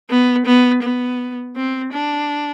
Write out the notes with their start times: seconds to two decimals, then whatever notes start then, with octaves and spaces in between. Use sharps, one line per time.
0.10 B3
0.46 B3
0.83 B3
1.56 C4
1.93 D4